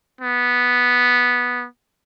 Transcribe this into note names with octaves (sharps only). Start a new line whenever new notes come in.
B3